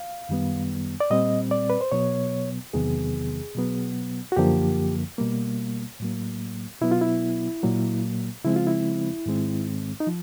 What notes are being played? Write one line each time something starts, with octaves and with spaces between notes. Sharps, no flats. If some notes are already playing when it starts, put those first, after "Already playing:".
Already playing: F5
F#2 D#3 G3 B3
D5
A#2 G3 C4 D#5
D5
B4
C5
B2 F#3 B3 C#5
E2 C3 D#3 F#3 B3 G#4
B2 F#3 B3
F#4
F#2 D3 F3 A#3 G4
B2 G3 A#3
A2 F#3 A#3
B2 F#3 B3 E4
F4
E4
A#2 F#3 A#3
C#3 F3 G#3 C4 E4
F4
E4
G#2 D#3 G#3 C4
D#4
F3